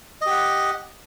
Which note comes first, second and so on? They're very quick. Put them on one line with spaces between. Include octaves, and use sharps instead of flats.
D#5 G4 F#5